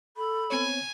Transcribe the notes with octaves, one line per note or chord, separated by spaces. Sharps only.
A4 B5
B3 C4 C#5 G#5